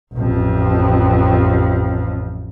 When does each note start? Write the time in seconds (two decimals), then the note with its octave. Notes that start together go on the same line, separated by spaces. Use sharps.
0.14 A1 F2